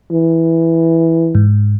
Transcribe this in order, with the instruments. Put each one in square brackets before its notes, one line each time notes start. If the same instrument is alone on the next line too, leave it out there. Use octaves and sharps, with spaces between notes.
[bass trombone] E3
[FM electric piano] G#2